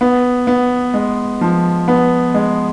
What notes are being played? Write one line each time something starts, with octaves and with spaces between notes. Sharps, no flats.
B3
B3
G#3
F3
B3
G#3